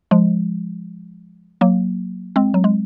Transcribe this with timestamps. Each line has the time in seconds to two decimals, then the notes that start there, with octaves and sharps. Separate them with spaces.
0.11 F3 G#3
1.61 F#3 A#3
2.36 G#3 C4
2.54 F#3
2.64 G#3